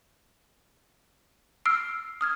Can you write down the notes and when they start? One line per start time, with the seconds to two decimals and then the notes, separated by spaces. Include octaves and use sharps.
1.65 E6 F6 C7 D7
2.21 D#6 F6 G#6